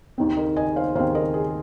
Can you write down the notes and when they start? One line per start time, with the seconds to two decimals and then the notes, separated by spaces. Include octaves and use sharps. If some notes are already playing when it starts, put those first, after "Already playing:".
0.18 D#2 D#3 C4
0.37 A#4 D#5
0.56 D#5 G#5
0.76 C5 F5
0.95 D#2 D#3 C4 C5 F5
1.15 A#4 D#5
1.34 G#4